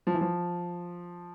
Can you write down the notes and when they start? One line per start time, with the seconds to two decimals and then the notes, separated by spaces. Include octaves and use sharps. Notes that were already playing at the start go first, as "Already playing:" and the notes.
0.07 F3
0.14 E3
0.21 F3